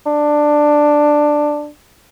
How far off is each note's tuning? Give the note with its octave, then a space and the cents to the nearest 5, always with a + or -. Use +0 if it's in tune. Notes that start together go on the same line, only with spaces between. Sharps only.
D4 +10